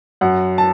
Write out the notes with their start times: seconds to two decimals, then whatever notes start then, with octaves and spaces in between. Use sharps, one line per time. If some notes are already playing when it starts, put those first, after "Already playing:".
0.21 F#2 F#5
0.58 A5